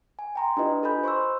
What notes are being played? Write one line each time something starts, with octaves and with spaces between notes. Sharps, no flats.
G#5
G5 A#5 C6
D4 E4 F4 G4 B4 D#5
A4 D#5 G#5 B5 G6
C5 C6 C#6 E6